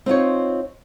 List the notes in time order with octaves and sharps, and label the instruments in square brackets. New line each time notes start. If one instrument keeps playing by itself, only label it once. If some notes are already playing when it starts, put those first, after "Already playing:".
[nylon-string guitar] C4 D#4 F4 C#5